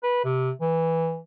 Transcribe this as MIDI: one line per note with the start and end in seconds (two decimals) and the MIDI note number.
0.03 0.24 71
0.25 0.51 48
0.61 1.19 52